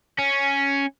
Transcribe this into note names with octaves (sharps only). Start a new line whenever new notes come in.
C#4